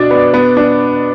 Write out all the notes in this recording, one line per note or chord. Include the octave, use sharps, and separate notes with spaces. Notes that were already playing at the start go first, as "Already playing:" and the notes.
Already playing: B2 D4 D5
B3
B3
D4